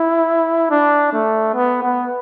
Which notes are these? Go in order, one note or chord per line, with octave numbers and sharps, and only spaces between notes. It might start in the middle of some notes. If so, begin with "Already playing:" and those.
Already playing: E4
D4
A3
B3
B3